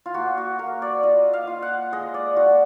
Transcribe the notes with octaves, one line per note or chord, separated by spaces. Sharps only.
F4
A#3 F#4
F#4
A#3 A#4
D5
F4 D#5
F5
F4
F#5
G#3 D#5
D5
F4 F#4